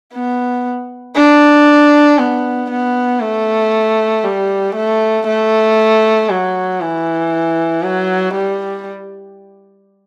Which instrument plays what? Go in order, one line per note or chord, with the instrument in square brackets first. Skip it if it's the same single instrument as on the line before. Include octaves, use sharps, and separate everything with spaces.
[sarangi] B3
D4
B3
B3
A3
G3
A3
A3
F#3
E3
F#3
G3